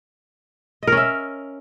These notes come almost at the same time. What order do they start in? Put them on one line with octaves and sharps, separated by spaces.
D#5 A#4 C#4 E5